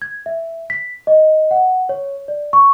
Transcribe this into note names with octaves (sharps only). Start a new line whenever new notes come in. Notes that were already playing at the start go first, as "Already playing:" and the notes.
G#6
E5
B6
D#5
F#5
C#5
D5
C#6